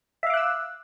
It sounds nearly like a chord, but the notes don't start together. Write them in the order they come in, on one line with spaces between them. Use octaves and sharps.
E5 F5 D6 F#6 E6